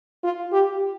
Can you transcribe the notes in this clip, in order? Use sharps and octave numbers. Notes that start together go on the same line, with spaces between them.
F4
G4